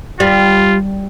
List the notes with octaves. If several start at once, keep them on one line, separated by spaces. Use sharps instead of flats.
G3 F4